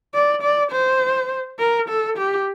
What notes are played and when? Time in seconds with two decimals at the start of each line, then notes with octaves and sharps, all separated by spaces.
0.14 D5
0.43 D5
0.72 C5
1.59 A#4
1.89 A4
2.18 G4